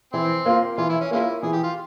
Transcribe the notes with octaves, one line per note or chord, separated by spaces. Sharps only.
E3 C4
A#3 F4
E3 F4
E4
C#4
G#3 A#3 C#4 E4 F4
E3 G#4
G4
F4